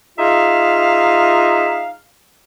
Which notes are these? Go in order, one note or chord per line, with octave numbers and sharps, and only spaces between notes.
D#4 F4 G#4 E5 F5